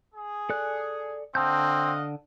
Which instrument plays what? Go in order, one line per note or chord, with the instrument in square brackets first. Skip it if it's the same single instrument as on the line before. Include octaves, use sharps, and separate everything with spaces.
[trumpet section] G#4
[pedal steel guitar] A4 D5 F#6
[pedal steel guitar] D3 A5 G6 [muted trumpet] C4 [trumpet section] D#5 F5 F#5